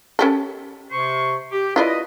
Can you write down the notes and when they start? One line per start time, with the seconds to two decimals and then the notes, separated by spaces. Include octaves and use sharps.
0.19 C#4 G4 A4
0.91 C3 C5 C#6
1.52 G4
1.76 E4 F4 B4 D5 D#5